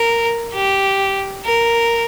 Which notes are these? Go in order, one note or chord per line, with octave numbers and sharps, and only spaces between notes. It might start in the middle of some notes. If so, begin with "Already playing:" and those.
Already playing: A#4
G4
A#4